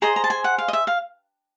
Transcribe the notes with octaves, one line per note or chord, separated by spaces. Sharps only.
G#4 C5 D#5 A#5
A#5
A5
G#5
F#5
F5
D#5
E5
F5